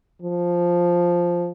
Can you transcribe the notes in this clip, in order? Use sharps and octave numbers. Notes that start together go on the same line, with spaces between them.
F3